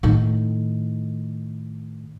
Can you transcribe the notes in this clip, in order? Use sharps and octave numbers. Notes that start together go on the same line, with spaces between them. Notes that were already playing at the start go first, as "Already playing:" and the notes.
A2 D#3